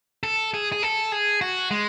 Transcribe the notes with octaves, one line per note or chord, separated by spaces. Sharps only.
A4
G#4
G#4
A4
G#4
F#4
G#3